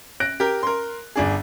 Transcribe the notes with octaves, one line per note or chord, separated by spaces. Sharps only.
F#6 A#6 D7
G4 A#4
A#4 C6
G1 D4 G#4